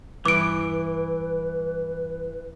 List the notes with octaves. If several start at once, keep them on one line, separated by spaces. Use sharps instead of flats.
G2 E3 B4 D6 D7